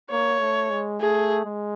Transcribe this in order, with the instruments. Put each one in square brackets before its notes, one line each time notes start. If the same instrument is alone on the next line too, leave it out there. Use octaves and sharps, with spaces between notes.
[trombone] A#3 [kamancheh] C#5
[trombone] A3
G#3
[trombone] A3 [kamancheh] G#4
[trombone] G#3